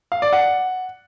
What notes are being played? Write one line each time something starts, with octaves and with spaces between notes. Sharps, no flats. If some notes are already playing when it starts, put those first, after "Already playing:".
F5
D5
F#5